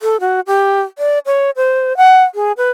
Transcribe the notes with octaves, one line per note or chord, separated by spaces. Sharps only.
A4
F#4
G4
D5
C#5
C5
F#5
G#4
B4